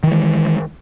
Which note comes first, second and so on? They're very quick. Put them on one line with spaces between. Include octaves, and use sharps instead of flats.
D#3 E3 G#3